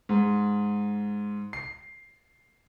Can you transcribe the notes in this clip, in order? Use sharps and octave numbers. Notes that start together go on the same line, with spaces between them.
G#2
C7